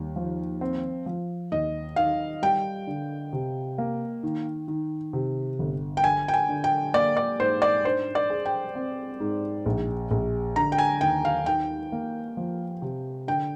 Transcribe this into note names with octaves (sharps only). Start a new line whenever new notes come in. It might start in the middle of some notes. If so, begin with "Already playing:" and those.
Already playing: D#2 G3
F3
C4
F3
D#2 D#5
D#3 F5
G3 G5
D3
C3
A#3
D#3
D#3
C3
G1
G5
D3 G#5
G5
G#5
D3
G5
A#3 D5
D5
G#2 C5
D5
D4 C5
D5
G#4
G5
C4
G#2
A#1
A#1
D3 A#5
G5
G#5
D#2 G5
F5
D#3 G5
A#3
F3
C3
D3 G5